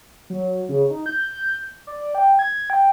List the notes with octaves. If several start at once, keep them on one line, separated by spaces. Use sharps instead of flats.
F#3
C#3
D#4
G6
D5
G5
G#6
G5